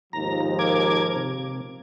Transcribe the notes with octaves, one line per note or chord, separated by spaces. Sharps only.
D#2 G#2 F3 A#5
A#4 D6 G#6
C3